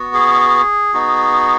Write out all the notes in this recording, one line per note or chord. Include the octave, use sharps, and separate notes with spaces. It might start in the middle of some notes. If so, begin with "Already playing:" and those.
Already playing: B3 F#4
G#4
B3 D#4 F#4